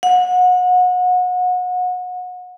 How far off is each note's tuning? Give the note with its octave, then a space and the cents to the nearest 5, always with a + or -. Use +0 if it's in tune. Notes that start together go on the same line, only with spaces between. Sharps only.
F#5 -30